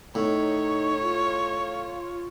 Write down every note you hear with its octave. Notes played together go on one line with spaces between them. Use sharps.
A2 D#4 C#5
F4